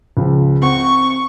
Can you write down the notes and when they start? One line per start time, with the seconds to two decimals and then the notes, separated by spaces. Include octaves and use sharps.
0.17 C#2 F3
0.62 C4 F#5 C#6